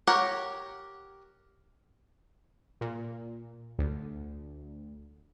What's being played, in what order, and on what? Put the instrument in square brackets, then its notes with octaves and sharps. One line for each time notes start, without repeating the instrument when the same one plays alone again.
[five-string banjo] G4 A#4 C#5 F#5
[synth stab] A#2
D2